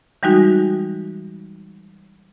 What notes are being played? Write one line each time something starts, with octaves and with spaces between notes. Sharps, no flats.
E3 G3 G#3 D#4 F#4